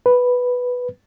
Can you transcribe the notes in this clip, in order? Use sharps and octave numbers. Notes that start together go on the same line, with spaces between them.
B4